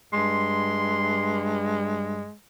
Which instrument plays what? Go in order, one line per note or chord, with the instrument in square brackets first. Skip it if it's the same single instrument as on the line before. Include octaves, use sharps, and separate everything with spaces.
[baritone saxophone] G2 [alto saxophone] G#3 [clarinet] C6